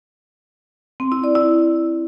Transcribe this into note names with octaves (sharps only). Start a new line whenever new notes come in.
C4
E4
D5
E4